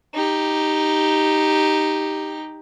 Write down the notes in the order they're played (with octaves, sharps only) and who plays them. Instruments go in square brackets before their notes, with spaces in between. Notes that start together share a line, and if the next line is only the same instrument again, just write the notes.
[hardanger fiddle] D#4 G4